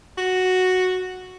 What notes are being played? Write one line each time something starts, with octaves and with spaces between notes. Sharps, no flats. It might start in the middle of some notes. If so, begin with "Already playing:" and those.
F#4